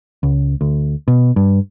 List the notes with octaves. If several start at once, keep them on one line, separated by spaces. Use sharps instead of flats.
C#2
D2
B2
G2